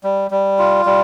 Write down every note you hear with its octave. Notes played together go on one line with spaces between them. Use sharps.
G3
G3
F4
G3